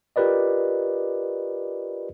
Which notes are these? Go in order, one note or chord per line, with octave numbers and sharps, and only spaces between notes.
F4 G4 A#4 B4 D5 D#5